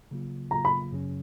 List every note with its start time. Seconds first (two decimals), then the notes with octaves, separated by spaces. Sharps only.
0.11 C#3 F#3 A#3 F4
0.51 C#3 F#3 A#3 F4 A#5
0.65 B5
0.92 F#2 C#3 F#3 C#4